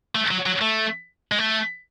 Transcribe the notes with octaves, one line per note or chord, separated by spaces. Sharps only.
A3
F#3
F#3
A3
G#3
A3